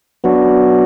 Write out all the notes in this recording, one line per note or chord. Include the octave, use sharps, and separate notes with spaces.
F#3 B3 D4 F#4